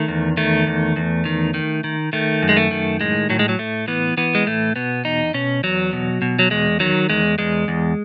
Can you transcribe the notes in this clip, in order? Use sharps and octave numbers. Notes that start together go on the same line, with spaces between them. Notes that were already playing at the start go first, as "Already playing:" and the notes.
Already playing: D#3 A3
E2
D#3 A3
E2
E2
D#3
D#3
D#3
D#3 A3
F#2
G#3
A3
D#3
A2 G#3
A2 F#3
G#3
F#3
A2 A3
E3 B3
E3 B3
G#3
A2 A3
B2 B3
E2 D#4
B2 C#4
E2 F#3
B2
B2
F#3
E2 G#3
D#3 F#3
E2 G#3
E2 G#3
E2